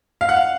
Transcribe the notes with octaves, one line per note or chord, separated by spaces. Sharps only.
F5
F#5
F5